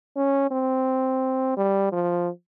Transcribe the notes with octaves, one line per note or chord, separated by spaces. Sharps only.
C#4
C4
G3
F3